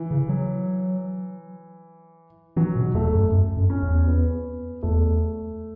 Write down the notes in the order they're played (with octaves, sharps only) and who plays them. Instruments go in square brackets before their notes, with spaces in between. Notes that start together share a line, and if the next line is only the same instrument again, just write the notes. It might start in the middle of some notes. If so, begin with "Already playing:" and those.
Already playing: [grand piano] E3
[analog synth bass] C#3
F#3
[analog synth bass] E3 [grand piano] F#3
[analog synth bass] B2
[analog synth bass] E2 [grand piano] A3
[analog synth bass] F#2
F#2
F#2
[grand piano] C#4
[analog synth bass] E2
[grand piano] B3
[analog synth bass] E2 [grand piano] A3